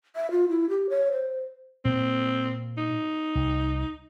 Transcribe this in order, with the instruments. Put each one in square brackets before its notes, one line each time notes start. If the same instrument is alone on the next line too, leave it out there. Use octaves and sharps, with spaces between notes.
[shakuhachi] E5
F4
E4
G4
C#5
C5
[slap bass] A#2 A#3 [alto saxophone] C4
[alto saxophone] D#4
[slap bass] C2